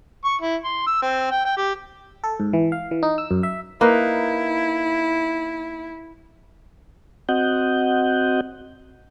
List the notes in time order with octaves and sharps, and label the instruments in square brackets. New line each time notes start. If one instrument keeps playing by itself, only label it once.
[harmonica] C#6
E4
C6
E6
C4
G5
G5
G4
[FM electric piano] A4
G#2
E3
F5
E3
D#4
E6
F#2
E5
[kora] A#3 D#4 B4 [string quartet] E4
[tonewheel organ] C4 F#4 D#5 F#5 G6